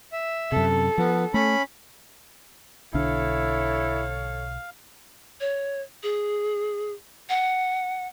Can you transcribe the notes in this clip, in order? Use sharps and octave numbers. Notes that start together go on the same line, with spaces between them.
E5
F#2 C3 A4
F3 B3
A3 C#4 B5
B1 D3 D4 E4 A4 C#5 F5
C#5
G#4
F#5